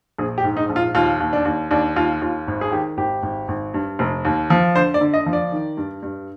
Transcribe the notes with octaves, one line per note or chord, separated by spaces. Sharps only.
A#1 G#4
G4
G#2
D#4
A#1
F4
D#2 F4
D#2
D4
D#2
D#2 D4
D#2 F4
D#2 F4
G#1
G#4
D#3 G4
G#1 G4
G#1
G#1
G2
F1
D#2
F3
D3 C5
D5
D3
D#5
F3
D5
D#3
G2
G2